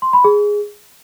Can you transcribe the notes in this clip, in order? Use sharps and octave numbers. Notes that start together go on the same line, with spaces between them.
C6
B5
G#4